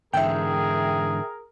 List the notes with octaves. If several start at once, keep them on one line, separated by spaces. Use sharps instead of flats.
G#2 D3 E3 G#4 A#4 E5 G5